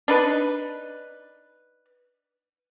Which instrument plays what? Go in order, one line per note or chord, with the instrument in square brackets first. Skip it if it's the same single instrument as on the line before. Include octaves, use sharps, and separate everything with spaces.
[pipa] D4 D#4 B4